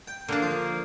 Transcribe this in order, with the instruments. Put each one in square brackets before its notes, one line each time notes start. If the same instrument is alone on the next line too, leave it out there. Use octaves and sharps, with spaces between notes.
[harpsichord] G5
[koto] D3 D4 [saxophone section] A#3
[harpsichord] F3